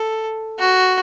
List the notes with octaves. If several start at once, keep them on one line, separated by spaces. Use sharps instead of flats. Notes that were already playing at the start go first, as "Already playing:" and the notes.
Already playing: A4
F#4